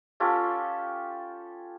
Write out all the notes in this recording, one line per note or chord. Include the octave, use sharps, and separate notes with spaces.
C#4 F4 G4 A4